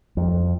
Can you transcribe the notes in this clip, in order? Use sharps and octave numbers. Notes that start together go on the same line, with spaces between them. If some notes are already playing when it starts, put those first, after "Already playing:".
F2